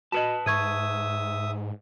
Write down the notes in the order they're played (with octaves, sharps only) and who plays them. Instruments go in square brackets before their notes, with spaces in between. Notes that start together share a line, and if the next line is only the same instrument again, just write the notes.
[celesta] F#4 D#5 [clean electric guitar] B4 A5
[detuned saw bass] G#2 [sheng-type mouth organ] E5 D#6 [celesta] C#6 G#6 D#7